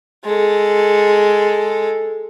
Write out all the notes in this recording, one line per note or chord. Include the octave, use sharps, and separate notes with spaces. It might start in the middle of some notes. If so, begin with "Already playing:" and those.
G#3 A4